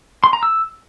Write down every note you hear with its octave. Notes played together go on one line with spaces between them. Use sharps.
C6
A#5
E6